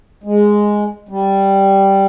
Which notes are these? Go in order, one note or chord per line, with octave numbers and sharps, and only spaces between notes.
G#3
G3